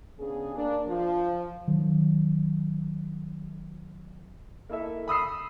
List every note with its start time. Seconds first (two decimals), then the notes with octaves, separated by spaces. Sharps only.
0.19 C#3 B3 D4 G#4
0.55 A#3 D4
0.88 F3
1.68 D#3 F#3
4.70 A#3 E4 A4 E5
5.08 B5 D#6 E6 C7